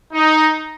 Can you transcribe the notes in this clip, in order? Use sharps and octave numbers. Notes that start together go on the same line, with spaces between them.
D#4